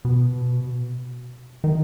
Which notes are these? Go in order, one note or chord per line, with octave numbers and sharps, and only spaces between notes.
B2
D#3